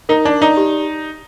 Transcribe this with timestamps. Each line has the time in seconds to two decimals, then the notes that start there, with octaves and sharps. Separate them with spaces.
0.09 D#4 A#4
0.25 D4 D5
0.41 D#4 D5
0.57 G4